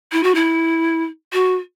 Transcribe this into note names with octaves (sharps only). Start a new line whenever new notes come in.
E4
F#4
E4
F#4